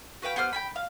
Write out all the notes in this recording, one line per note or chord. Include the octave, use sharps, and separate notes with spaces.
F#4 B4 F5 G5
B3 G4 C5 F6
G5 G#5 B5
F5